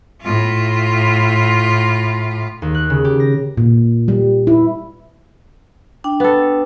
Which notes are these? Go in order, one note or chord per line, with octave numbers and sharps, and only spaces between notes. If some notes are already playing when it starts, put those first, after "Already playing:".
A2 F4
D#2
F#6
C#3
G4
A#6
A#2
G3
E4
D4 G5
B3 A4